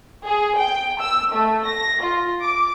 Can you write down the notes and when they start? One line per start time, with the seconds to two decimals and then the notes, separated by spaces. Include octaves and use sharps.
0.24 G#4
0.56 G5
0.99 E6
1.33 A3
1.67 A#6
2.03 F4
2.42 D6